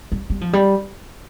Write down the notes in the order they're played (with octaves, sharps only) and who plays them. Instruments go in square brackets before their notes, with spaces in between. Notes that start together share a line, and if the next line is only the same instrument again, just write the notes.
[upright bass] G3
G3
F3
G3